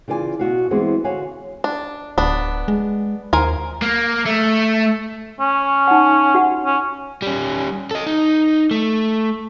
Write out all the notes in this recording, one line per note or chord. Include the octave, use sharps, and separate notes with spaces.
C#3 E3 F4 D5 D#5 G#5
B2 F#4 F5
E3 G3 G#3 B3 C4 G#4
D3 F#4 C#5 F5 F#5 G#5
D4
D1 B3 D4
G#3
D#2 A#4 C5 G#5
A#3
A3
C#4
D#4 F#5
F#4 F#5
C#4
G3 C#4
A4 D#5
D#4
A3